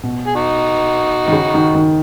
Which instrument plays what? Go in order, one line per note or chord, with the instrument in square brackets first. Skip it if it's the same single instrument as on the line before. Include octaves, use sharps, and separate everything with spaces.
[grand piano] B2
[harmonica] G#4
D#4 F#4
[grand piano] D#3
C#3
D#3
D#3